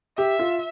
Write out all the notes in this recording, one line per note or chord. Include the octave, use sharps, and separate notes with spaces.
G4 E5
F4